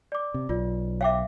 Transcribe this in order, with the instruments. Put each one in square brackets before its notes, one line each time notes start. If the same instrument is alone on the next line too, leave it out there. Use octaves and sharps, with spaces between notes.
[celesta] D5 D6
[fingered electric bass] C3
[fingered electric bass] B1 [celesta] F4 D5
[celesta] C#5 G5 D6 [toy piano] E5 F5